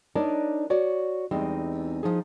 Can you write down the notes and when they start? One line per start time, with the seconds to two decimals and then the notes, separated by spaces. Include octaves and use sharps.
0.15 D4 D#4 A#4 C#5 D5
0.70 F#4 C#5 D5
1.31 E2 G3 G#3 C4 D#4
2.03 F3 D#4 G#4